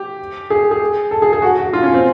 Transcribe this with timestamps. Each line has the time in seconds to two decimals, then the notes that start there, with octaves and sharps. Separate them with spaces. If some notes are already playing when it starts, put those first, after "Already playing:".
Already playing: G4
0.50 G#4
0.71 G#4
1.11 A4
1.22 G#4
1.33 G#4
1.42 F#4
1.58 F#4
1.73 F4
1.83 C#4
1.94 C4